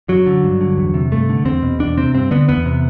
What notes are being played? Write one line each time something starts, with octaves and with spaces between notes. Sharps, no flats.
F#2 F#3
D3
G2
D3
E2
C3
G2 A3
D3
E2 C4
B2
E2 D4
C3 C4
G2 C4
D3 B3
E2 B3
C3